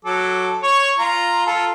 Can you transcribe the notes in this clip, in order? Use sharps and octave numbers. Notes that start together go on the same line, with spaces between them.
F#3 A4 D6
C#5 C#6
F4 A#5
F4 A4